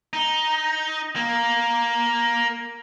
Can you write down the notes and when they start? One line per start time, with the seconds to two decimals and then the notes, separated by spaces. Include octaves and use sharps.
0.13 D#4
1.16 A#3